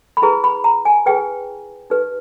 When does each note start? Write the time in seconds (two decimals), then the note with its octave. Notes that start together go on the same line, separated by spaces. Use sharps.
0.17 B5
0.22 E4 G#4 B4 A#5
0.44 B5
0.64 A#5
0.85 G#5
1.06 E4 G#4 B4 G5
1.90 D#4 G4 B4